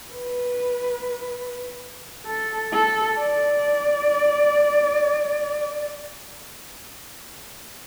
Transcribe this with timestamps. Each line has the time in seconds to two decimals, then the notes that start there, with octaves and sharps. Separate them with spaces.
0.11 B4
2.26 A4
2.73 A4
3.19 D5